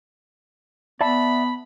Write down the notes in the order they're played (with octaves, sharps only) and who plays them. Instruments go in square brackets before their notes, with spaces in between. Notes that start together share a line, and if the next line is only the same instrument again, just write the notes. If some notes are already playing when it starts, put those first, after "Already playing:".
[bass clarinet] B3 [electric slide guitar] D5 E5 A5 [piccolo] B5